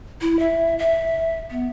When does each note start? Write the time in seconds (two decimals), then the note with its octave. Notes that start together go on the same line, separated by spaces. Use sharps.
0.21 E4
0.39 E5
0.79 E5
1.51 B3